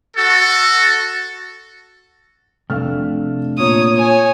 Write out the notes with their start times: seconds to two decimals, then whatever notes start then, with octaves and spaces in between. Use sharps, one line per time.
0.17 F#4 A4
2.70 F1 C3 A3 D4 F5 F6
3.58 A#2 A#3 C#5 D#6
3.96 C#5 G#5